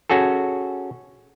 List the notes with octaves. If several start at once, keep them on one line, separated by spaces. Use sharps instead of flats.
C#4 F#4 G#4 A4